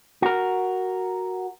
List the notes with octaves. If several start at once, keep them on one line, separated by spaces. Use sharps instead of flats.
F#4 A#4